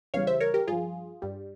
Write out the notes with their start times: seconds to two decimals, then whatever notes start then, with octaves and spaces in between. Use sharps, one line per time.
0.14 E2 C#3 E3 G3 C#5 F5
0.27 C5 E5
0.40 A#4 C#5
0.54 G4 A#4
0.67 G2 F3 F4 G#4
1.22 G2 G3